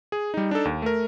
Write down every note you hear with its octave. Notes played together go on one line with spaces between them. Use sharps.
G#4
G3 D#4
D4 D#4 A4
D#2
A3 A#4